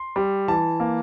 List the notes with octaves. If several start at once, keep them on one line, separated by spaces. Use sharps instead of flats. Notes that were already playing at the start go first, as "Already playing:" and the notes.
Already playing: C6
G3
E3 A5
A#3